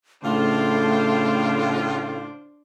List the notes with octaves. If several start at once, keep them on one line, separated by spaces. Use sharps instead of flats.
A2 C#3 A3 D4 F4 C5